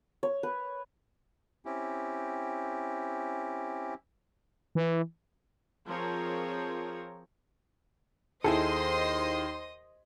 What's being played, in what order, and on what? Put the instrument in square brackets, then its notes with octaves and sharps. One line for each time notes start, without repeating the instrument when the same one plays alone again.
[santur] C#5
B4
[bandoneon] C4 C#4 E4 G4
[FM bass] E3
[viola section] F3 C4 G#4 A#4 C#5
[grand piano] D#2 [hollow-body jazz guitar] E4 G#4 A4 [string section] C5 C6 [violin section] D#5 D#6